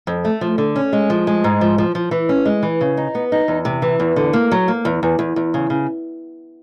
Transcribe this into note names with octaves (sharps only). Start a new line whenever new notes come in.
F2
A3
F3
D3
C#4
G#3
F3
G#3
G#2
F3
F3
F3
E3
C#4
G#3
E3
C#3
D#4
B3
D#4
E2
C3
E3
E2
D3
A#3
F#3
A#3
E2
E2
E2
E2
C#3
C#3